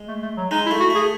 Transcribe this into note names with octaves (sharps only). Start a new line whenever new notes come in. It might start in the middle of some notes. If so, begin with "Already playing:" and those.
Already playing: G#3
A3
A3
F#3
G#3 D#4
E4
A3
F#4
A3 G#4